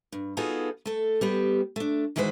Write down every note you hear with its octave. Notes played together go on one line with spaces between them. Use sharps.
G2
B3 D#4 F4 F#4 G#4 A4
A3 A4
G3 B3 G4
A3 D4
D#3 E3 G#3 F#4 B4 C5